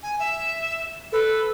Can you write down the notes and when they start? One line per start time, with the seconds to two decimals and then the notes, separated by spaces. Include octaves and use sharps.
0.03 G#5
0.19 E5
1.12 A4 B4